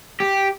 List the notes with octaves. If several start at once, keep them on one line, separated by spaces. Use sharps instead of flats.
G4